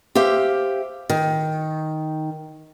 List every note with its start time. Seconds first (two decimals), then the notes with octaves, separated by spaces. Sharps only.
0.15 G4 C5 E5 F5
1.10 D#3